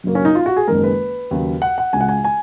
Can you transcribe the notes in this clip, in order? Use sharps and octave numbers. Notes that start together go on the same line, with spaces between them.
F#2 C#3 F#3 A#3
C#4
D#4
F4
F#4
G#4
F#1 F#2 D#3 G#3 A#4
B4
D#2 C#3 F#3
F#5
F#5
C#2 C#3 G#3 G#5
F#5
G#5
G#5